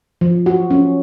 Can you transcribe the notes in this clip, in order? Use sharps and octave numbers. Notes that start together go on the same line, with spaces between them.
F3
F#4
C#4